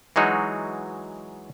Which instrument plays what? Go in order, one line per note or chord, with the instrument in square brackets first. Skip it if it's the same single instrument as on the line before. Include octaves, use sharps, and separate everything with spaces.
[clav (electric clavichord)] E3 F#3 G#3 D#4 F#4